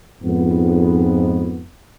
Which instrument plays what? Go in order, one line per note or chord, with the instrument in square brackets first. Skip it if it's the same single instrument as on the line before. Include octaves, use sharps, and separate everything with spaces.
[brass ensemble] F2 G#2 B3